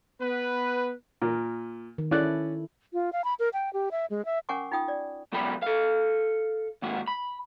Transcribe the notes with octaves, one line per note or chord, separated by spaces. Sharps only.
B3 B4
A#2 A#4
D#3
C#4 E4 A4 D5 F#6
F4
F5
B5
A#4
G5
G4
E5
G#3
E5
C#4 A#4 F#5 G#5 C#6 D6
D#4 F4 G5 D#6
D5
C#2 B2 F#3 G3 G5 B5
A4 F5
D#2 G#2 F#4
B5